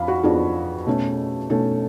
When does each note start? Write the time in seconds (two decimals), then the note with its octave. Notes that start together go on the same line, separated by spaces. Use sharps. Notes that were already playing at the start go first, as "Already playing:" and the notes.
Already playing: F2 F3 F5 B5
0.08 F#4
0.23 F2 F3 B3 D4 G#4
0.86 B2 A3 C#4
1.50 B2 A3 C#4 A4